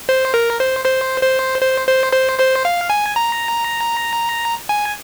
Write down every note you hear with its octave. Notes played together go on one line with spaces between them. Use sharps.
C5
A#4
C5
C5
C5
C5
C5
C5
C5
F5
G#5
A#5
G#5